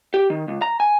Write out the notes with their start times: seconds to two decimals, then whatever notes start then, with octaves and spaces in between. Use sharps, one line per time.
0.14 G4
0.30 D#3
0.48 C#2
0.62 A#5
0.80 G#5